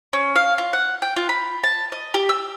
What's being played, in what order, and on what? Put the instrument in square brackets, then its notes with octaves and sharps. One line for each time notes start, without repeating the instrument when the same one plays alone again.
[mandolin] C#4
F5
F4
F#5
G5
F4
B5
A5
D#5
G4
E6